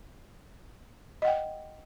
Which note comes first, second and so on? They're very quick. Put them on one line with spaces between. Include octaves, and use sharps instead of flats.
D#5 F#5 G5